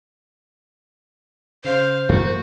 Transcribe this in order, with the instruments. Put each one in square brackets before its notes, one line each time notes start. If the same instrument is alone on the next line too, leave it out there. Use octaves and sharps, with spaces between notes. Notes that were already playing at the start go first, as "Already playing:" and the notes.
[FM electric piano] C#3 [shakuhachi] C5 [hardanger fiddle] F5
[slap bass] F#2 E3 A3 [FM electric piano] A#3 [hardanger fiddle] F#4